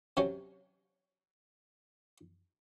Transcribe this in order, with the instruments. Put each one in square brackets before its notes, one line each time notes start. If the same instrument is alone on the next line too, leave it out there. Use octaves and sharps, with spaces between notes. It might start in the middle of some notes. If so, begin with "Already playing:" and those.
[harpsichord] C3 F#3 C#4